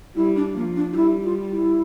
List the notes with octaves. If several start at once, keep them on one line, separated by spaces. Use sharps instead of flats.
G3 E4
D4
F3 A#3
D4
F4
G3 E4
F4
E4